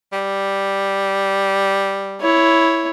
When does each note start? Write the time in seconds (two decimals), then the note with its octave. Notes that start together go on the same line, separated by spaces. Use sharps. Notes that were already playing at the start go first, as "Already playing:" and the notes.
0.13 G3
2.21 E4 C#5